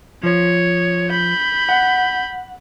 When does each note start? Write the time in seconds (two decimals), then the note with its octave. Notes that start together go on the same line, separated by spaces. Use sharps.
0.23 F3 C#5
1.10 B5 G6
1.69 F#5